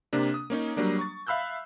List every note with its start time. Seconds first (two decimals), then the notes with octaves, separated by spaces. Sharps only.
0.13 C3 A#3 D4
0.34 D#6
0.50 A#3 C#4 D#4
0.77 F#3 G3 A#3 D4
0.99 C#6 A6
1.27 E5 F5 B5 E6 F#6 G6